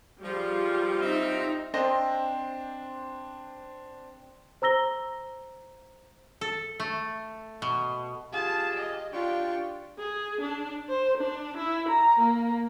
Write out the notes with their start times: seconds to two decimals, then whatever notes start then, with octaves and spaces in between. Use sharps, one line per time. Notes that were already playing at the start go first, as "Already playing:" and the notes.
0.23 F3 G3 F4 G#4
1.01 C4 D#4 E5
1.74 C4 D4 C5 D#5
4.62 C5 A#5 E6 A#6 G7
6.41 A4
6.80 A3
7.62 B2
8.33 F4 G4 G#4 A5
8.75 D#5
9.13 D4 F4 G4 G5 C#6
9.99 G#4
10.41 D4
10.89 C5
11.18 D4
11.57 E4
11.89 A#5
12.19 A#3